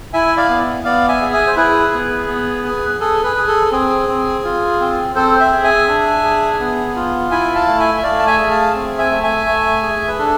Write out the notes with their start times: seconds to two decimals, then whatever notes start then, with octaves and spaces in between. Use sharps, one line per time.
0.13 E4 E5 G#5
0.37 D5 F5
0.49 B3
0.84 B3 D5 F5
1.08 E5 G#5
1.22 G#4
1.33 E5 G#5
1.47 C5
1.56 E4 G#4 B4
1.92 B3
2.28 B3
2.65 G#4
3.00 G#4 A4
3.24 G#4 B4
3.36 G#4
3.48 A4
3.72 C4 G#4
4.08 C4
4.44 F4
4.80 C4
5.15 C4 A4 C5
5.39 C5 E5
5.52 G#4
5.64 E5 G#5
5.88 D4
6.24 G#4
6.60 B3
6.96 F4
7.31 E4 E5 G#5
7.55 F5 A5
7.67 A3
7.80 E5 G#5
7.98 E5
8.03 A3 D5 F5
8.19 A5
8.26 E5 G#5
8.38 G#4
8.50 F5 A5
8.75 C4
8.98 E5 G#5
9.11 A3
9.23 E5 G#5
9.46 A3
9.83 G#4
10.08 B4
10.18 D4 A4